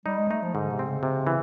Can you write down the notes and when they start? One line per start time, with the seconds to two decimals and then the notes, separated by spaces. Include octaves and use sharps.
0.05 G3 D#4
0.18 G#3
0.31 A3 D#4
0.43 F3
0.54 G#2 D3
0.70 C3
0.79 C4
0.87 C#3
1.03 C3
1.27 E3